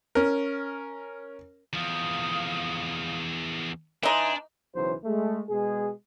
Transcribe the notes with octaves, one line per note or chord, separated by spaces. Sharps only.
C#4 A#4
E2 F3 F5 D#6
E3 D4 D#4 G#5 A#5 C6
B1 C#3 E3 F#3 C5
G#3 A3
B2 G#3 G#4